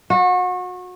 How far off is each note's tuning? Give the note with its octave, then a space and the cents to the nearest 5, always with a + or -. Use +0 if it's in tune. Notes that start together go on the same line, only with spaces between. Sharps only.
F#4 -30